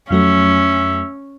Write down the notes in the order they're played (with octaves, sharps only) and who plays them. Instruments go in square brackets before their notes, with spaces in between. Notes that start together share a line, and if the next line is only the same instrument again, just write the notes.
[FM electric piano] F2 F#3 A3 [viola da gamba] C#4 [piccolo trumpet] E5